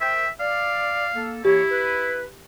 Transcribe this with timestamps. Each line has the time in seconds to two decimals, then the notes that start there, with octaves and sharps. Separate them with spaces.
0.01 A#4 C5 E5 G5
0.40 D5 F5
1.16 A#3 A4
1.45 E3 A#3 E4 G4 C#5
1.71 B4